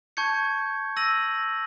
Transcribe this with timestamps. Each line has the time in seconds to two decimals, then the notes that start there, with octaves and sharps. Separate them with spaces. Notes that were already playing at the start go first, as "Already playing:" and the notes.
0.17 A5 C#6 G6 G#6 C#7
0.96 E6 A#6 D#7 F#7